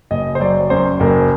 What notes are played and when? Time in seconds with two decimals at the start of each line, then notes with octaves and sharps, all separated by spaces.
0.11 F#1 D#5
0.35 C5
0.40 F#3 D5
0.70 F#2 C5
1.00 F#1 A#4